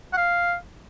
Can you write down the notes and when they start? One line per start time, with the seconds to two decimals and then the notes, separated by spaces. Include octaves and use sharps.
0.13 F#5
0.17 F5